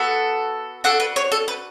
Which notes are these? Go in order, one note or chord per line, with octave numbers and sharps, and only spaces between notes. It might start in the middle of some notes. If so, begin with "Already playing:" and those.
Already playing: B3 F#4 A4
D4 F#4 A4 F#5
B4
C#5
A4
B4